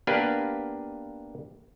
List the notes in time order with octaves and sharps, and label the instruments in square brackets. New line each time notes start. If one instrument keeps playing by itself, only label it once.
[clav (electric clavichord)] A#3 B3 D4 G4 B4 F5